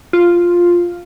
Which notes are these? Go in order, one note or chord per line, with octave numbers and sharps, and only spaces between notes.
F4